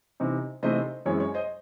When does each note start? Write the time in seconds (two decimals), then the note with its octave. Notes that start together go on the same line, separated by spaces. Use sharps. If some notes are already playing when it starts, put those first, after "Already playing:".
0.20 C3 E3 C4 D#4
0.63 C3 E3 A3 D#4 C5 D#5
1.05 F#2 E3 G#3 C4 C#5
1.20 C#5
1.34 C5 D#5